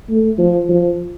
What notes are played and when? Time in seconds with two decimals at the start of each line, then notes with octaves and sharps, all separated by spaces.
0.09 A3
0.39 F3
0.69 F3